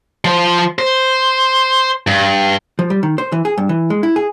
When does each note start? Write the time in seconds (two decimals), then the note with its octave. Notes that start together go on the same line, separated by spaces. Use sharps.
0.25 F3 C5
0.79 C5
2.07 G2
2.79 F3
2.90 G3
3.03 D#3
3.18 C5
3.32 E3
3.45 G#4
3.58 G2
3.69 E3
3.90 G#3
4.03 E4
4.16 G#4